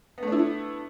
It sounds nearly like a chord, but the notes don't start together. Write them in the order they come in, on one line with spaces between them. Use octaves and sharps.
B3 A3 D4 E4